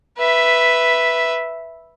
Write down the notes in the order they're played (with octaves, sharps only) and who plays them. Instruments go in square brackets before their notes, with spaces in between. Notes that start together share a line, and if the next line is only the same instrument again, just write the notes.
[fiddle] B4 E5